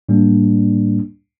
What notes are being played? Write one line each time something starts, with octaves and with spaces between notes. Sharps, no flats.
A2 G3 A#3 D4